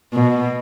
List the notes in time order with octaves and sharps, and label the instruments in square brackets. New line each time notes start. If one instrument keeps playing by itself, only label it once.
[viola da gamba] B2